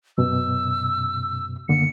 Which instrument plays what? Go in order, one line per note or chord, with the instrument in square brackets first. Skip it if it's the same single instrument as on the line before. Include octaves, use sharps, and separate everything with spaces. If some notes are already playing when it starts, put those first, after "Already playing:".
[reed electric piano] F#2 B2 [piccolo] E6
[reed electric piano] F#2 D3 A#3 [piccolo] C#7